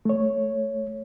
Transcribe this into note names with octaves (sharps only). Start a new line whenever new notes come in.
A3 C#5